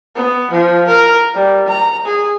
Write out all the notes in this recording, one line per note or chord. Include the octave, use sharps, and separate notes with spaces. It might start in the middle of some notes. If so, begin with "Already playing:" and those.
B3
F3
A#4
G3
A#5
G#4